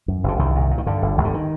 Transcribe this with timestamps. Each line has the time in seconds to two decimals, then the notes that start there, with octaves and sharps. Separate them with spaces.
0.08 F#2
0.24 F#1 D3
0.39 C2 D#3
0.55 A#2
0.71 A#2
0.78 D#3
0.86 G2 D3
1.02 G1
1.18 G1
1.25 D3
1.34 D#3